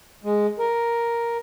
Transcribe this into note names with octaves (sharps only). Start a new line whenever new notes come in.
G#3
A#4